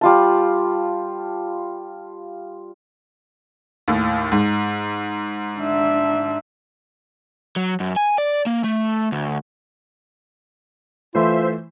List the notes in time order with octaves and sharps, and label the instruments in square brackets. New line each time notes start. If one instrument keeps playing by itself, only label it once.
[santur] G3 F4 A5
[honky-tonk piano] D#2 A2
G#2
[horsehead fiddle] D4 E5
[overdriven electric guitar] F#3
F#2
G#5
D5
A#3
A3
D2
[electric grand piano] E3 A3 E4 [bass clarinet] F4 [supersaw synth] C5 E5